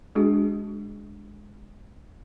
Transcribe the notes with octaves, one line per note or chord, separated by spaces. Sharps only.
G#3 D4 F#4 G#4